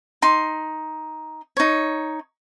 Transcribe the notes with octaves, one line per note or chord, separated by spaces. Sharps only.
D#4 C6
D#4 C#5